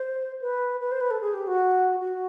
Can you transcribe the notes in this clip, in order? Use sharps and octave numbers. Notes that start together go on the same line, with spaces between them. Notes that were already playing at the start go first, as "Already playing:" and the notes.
Already playing: C5
B4
B4
C5
B4
A4
G#4
G4
F#4
F#4